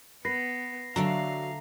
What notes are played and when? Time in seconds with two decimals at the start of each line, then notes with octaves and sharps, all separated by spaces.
0.25 B3 B4 A#6 C7
0.96 D3 F#3 A3 D4 F5 A#5